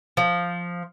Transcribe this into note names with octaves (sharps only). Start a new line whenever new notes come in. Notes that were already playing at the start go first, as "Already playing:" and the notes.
F3